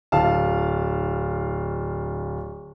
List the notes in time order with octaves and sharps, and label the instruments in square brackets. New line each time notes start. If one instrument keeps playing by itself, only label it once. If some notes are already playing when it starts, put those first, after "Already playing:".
[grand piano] D1 F5 A5